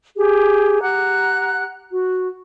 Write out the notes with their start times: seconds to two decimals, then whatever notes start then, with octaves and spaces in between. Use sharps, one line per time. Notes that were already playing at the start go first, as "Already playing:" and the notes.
0.17 G4 G#4
0.81 G4 F#5 A#5 F#6
1.93 F#4